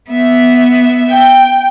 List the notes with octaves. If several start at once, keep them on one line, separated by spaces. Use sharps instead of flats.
B3 E5
G5